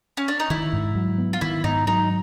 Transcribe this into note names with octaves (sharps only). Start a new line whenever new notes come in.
C#4
D4
D#4
D#3 E4
G#2
F#3
B3
F4
D#3 E4
G#2 D#4
F#3 D#4